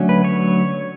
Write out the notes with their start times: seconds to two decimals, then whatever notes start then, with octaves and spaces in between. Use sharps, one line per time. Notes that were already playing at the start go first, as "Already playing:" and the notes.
Already playing: D3 F#3 A3 C#4
0.09 B4
0.24 C#5